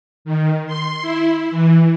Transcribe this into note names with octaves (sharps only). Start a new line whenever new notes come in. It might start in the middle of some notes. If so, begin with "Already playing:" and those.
D#3
C6
E4
E3